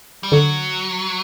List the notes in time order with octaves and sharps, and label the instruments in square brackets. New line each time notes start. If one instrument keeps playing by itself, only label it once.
[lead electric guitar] G3
[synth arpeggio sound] D3 [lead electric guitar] F#3